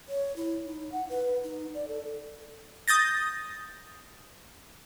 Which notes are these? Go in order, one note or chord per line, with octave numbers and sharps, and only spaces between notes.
C#5
E4
D#4
F#5
B4
D#4
D5
A4
D#6 G6 A6 A#6